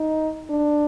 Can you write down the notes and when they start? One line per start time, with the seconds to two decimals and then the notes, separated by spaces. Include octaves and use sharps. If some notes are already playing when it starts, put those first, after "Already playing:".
Already playing: D#4
0.49 D4